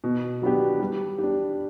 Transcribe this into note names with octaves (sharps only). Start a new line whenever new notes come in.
B2
F#3 B3 D4 G4
G3
D4 G4